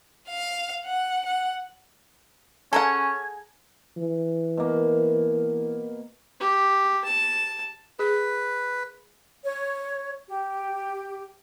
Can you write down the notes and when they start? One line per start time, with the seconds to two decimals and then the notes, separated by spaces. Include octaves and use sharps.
0.29 F5
0.86 F#5
1.25 F#5
2.73 C#4 G#4 A4 F#5 A#5 G#6
3.97 E3
4.57 B2 A#3
6.40 G4
7.05 A5
7.99 G#4 B4
9.44 C#5
10.28 G4